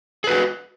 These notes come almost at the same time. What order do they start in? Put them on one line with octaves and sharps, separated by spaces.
G#4 B4 F#4